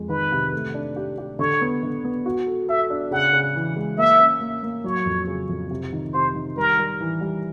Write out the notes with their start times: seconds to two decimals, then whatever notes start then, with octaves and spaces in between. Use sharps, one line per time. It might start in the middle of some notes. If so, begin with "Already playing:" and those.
Already playing: F2 G#3
0.09 D#3 B4
0.32 C3
0.53 A3
0.74 D4
0.96 G4
1.18 G4
1.39 D3 C#5
1.61 B3
1.83 D3
2.04 B3
2.26 F#4
2.47 A4
2.68 A4 E5
2.90 D4
3.11 C#3 F#5
3.33 C#3
3.55 E3
3.76 G#3
3.98 A#3 E5
4.19 C#4
4.41 A#3
4.63 A#3
4.84 F#3 C#5
5.06 F2
5.27 C#3
5.49 F2
5.71 C3
5.93 D#3
6.14 C3 C5
6.35 D#3
6.57 G3 A#4
6.78 G3
7.00 E3
7.21 G3